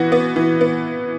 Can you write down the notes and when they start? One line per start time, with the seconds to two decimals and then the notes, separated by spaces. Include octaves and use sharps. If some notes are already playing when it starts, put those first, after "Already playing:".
Already playing: E3 B3 F#4
0.12 B3
0.36 E3
0.61 B3